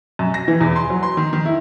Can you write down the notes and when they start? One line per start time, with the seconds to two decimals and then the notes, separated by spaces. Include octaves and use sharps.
0.19 F#2
0.34 A#6
0.48 E3
0.61 E2
0.76 C6
0.90 F#3
1.03 C6
1.17 D#3
1.33 D#3
1.45 E4